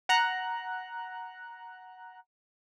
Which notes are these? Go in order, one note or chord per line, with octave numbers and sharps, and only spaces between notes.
F#5 A#5 F#6